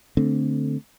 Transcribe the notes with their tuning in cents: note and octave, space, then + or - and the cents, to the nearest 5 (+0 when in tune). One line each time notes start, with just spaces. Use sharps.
D3 -5 A3 +5 C4 +0